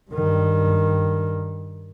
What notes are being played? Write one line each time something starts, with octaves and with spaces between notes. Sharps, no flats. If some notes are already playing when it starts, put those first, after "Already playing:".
G2 D#3